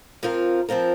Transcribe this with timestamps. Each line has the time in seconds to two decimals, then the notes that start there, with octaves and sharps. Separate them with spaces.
0.23 F3 C4 F4 A#4
0.69 F3 C4 F4 A#4